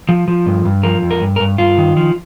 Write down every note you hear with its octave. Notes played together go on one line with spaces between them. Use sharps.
F3
F3
G2
G2
F3 A#4
F2
A#4
G2
A#4
G2
G2 F4
D#3
F3